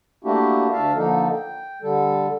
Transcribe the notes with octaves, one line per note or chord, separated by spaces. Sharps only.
A3 A#3 D4 E4 F#4 G4
D2 D4 E5 F5 A5
D3 F3 A#3 D#4 A4
G5
D3 G3 A4